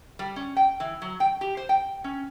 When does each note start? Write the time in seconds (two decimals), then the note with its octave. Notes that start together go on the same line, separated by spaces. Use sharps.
0.19 G3
0.36 C#4
0.56 G5
0.80 E3
1.02 F#3
1.20 G5
1.41 G4
1.57 C5
1.69 G5
2.04 C#4